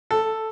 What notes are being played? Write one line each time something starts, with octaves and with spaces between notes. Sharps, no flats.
A4